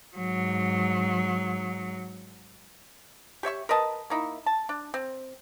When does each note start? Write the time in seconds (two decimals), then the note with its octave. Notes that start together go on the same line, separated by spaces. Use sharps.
0.17 G#2 F#3
3.43 G4 C#5 E5 C#6
3.69 A#4 B4 D#5 A5
4.10 A#3 D#4 E4
4.46 A5
4.69 D4
4.94 C4